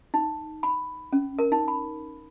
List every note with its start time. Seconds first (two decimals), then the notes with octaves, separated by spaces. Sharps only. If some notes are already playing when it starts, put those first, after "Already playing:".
0.14 D#4
0.63 B5
1.13 C#4
1.39 A#4
1.52 D#4
1.68 B5